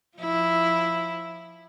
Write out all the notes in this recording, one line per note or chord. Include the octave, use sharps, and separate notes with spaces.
F3 E4